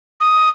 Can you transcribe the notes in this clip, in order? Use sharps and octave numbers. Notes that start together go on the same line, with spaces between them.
D#6